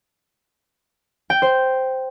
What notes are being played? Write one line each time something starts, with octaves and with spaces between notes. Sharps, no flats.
G5
C5